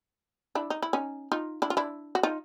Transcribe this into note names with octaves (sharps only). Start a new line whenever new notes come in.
D4 E4
D#4
E4
C#4 D#4
D#4 F4
D4 E4
F4
D4 E4
F#4
D#4 F4